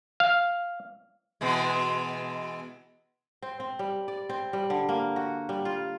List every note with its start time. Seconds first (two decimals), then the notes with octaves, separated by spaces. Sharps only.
0.20 F5
1.41 B2 E3 G#3
3.42 C4
3.60 C4
3.79 G3
4.08 D5
4.29 C4
4.53 G3
4.70 D3
4.89 A#3
5.16 F#4
5.49 G3
5.65 F4